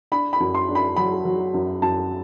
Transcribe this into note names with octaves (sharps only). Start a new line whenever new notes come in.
D4 B5
B5
F#2
C6
D4
B5
F#3 B5
F#3
F#2
F#2 A5